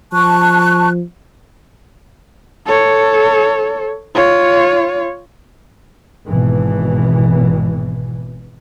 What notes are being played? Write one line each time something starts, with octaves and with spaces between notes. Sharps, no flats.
F3 A5 C#6 F#6
A4 C#5
F4 C#5
G#1 B2 E3